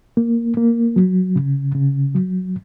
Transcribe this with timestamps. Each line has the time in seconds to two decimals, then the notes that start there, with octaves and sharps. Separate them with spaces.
0.17 A#3
0.57 A#3
0.96 F#3
1.36 C#3
1.75 C#3
2.15 F#3